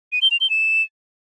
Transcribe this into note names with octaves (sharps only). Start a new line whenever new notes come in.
D#7
G7
F7
G7
E7